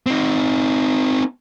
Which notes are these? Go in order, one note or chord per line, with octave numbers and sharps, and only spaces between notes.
C4 D#4